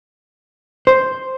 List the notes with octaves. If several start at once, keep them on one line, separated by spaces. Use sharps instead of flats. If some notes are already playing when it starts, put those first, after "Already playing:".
C5